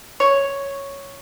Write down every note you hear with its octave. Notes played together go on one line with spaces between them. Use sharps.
C#5